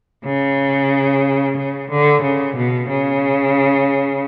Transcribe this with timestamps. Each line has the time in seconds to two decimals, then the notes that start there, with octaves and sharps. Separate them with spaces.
0.24 C#3
1.55 C#3
1.89 D3
2.21 C#3
2.55 B2
2.88 C#3